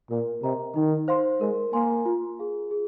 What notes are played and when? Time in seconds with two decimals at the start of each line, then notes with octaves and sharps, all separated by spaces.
0.10 A#2 A#4
0.43 C3 D#5 A#5
0.75 D#3 D#4
1.08 C5 F5 C6
1.41 G#3 A#4
1.73 A#3 G#5 C6
2.06 F4
2.39 G#4 F5
2.71 G#4